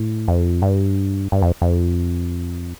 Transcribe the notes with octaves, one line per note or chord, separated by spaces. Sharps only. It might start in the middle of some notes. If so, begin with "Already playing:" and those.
Already playing: A2
F2
G2
G2
F2
F2